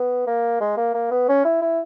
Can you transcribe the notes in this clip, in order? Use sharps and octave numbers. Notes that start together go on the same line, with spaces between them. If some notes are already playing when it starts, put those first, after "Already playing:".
Already playing: B3
A#3
G#3
A#3
A#3
B3
C#4
E4
E4